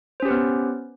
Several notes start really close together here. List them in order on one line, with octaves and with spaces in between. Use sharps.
C5 C#4 G4 B4 B3